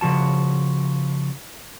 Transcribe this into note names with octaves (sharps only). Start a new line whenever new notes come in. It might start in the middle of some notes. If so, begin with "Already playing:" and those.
C#3 F3 F#4 A5